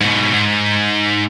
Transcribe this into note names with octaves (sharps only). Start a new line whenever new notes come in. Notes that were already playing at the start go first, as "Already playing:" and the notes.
G#2 B2
G#2